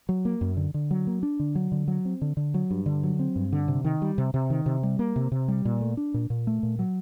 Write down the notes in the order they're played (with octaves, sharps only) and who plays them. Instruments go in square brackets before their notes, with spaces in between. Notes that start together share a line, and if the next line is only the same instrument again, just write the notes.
[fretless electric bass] F#3
A#3
F#2
D3
D3
F#3
A#3
D4
D3
F#3
D3
F#3
C4
D3
D3
F#3
G2
D3
F#3
C4
G2
D3
C3
D#3
G3
C3
C3
D#3
C3
G3
A#3
C3
C3
G3
A#2
A3
D4
A#2
A#2
A3
A#2
F#3